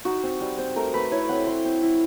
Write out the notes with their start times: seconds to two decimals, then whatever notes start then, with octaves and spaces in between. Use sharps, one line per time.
0.05 D#4 F#4
0.23 C4
0.40 G3
0.58 C4
0.76 A3 A#4
0.94 A3 B4
1.11 E4 C#5
1.29 C4 F#5
1.47 E4 C6
1.65 C4
1.82 E4